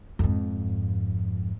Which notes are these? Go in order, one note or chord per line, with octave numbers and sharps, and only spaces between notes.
F2 G#2